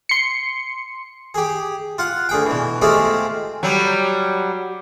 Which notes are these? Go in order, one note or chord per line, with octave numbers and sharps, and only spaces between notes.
C6 C#7
G4 G#4
F4 F#5
D2 G#4 G5
B2 E3
G#3 A3 C4 F4 G4 G#4
F#3 G3